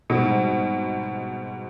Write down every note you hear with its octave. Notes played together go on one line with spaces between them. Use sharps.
G#2 B2 G3 C4 D#4